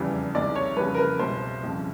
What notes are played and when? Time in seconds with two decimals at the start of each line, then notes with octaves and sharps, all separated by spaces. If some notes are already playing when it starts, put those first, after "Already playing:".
Already playing: F1 E2 C#3 E3 G3
0.35 C2 C3 D#3 G#3 D5
0.56 C#5
0.76 F2 C#3 E3 G3 B4
0.94 A#4
0.98 B4
1.19 C2 B2 G#3 C5
1.62 G1 F2 C#3